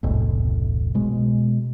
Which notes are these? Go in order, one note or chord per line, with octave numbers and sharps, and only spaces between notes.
E1 C2 A2
B2 G#3